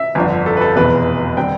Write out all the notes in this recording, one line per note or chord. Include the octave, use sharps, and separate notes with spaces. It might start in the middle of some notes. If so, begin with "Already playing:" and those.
Already playing: E5
G1 F2 D3
A4
B4
A4
F1 E2 B2 B3 B4
D3 G3 C4 G5